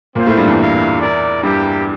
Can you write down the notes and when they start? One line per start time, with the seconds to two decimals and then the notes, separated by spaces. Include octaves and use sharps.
0.15 A#2 A#3 C4 F4 C5 F5
0.26 A2 A3
0.37 G2 G3
0.47 E2 E3
0.58 E4 A#4 F5
1.00 E4 A#4 D5
1.43 G2 G3 A#3 E4 G4